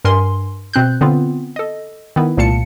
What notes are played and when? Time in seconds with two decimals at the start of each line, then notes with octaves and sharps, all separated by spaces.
0.05 G2 A#4 G#5 C6
0.73 B2 C4 F#6 G6
1.01 D3 B3 C4 F4
1.56 A4 D#5
2.16 D#3 B3 E4
2.37 C2 A#2 A3 F5 A5 C#7